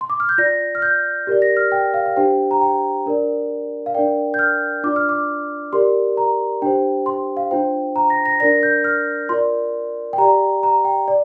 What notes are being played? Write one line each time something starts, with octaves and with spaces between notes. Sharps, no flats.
C6
D6
F6
G6
F4 D5 A#6
F6
G6
G4 A#4 D5
A#6
F6
G5
F5
F5
D4 G4 C5 G5
A#5
G5
D4 A#4 D5
F5
D4 A#4 D5 G5
G6
F6
D4 F4 D5 D6
F6
D6
G4 A#4 D5 C6
A#5
D4 G4 C5 G5
C6
F5
D4 F4 C5 G5
A#5
A#6
A#6
D4 A#4 D5 A#6
G6
F6
F4 A#4 D5 C6
G5
G4 D5 A#5
A#5
G5
D5